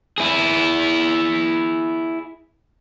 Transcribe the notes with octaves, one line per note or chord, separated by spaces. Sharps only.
E4 G#4